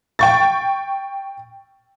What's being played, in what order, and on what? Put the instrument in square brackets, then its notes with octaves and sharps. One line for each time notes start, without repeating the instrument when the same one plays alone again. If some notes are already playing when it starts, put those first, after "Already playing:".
[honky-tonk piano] G5 C#6 A6